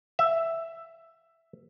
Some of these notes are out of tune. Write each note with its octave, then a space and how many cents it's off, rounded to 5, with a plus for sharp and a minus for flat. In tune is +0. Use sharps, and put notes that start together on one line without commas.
E5 +5